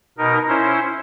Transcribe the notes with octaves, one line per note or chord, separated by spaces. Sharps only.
B2 D#4 A#4
C#4 E4 C5